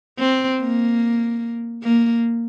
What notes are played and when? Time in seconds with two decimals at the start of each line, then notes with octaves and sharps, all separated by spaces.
0.19 C4
0.60 A#3
1.83 A#3